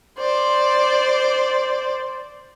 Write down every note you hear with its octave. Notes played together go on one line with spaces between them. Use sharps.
C5 D5